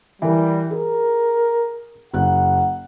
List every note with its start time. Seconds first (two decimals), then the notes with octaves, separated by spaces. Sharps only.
0.22 E3 G3 A#4
0.71 G#4 A#4
2.13 F#1 F#5 F#6